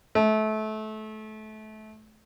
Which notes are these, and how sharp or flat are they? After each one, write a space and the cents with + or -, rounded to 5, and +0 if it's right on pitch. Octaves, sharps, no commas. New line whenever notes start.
A3 -25